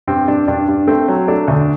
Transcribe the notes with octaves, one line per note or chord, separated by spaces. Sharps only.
G2 C4
G2 D4
G2 D4
G2
A3 C4
F#3
A3 D4
D2